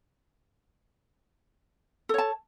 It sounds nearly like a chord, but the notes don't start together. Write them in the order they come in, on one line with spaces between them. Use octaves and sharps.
A4 C#5 A5